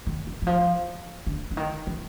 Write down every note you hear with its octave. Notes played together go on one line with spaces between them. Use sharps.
D#3
G3
E3
F3
D3
D3
D#3
E3